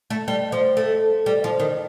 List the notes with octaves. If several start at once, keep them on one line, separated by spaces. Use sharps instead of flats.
A3
G3
F3
A3
G3
F3
D#3